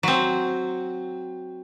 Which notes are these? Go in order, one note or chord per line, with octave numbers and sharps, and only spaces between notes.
F#3 C4